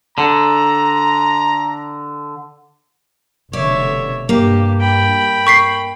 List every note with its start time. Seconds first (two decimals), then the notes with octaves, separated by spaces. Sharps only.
0.18 D3 A#5
3.53 F1 B2 D3 C#5 D5 E5
4.29 G2 A#3 G4
4.81 G5 B5
5.47 C#6 B6 C7